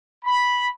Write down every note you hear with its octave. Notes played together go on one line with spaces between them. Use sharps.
B5